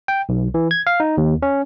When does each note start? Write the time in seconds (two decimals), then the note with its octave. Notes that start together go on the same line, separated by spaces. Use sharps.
0.08 G5
0.29 B1
0.54 E3
0.71 G#6
0.87 F5
1.00 D#4
1.18 D#2
1.42 C#4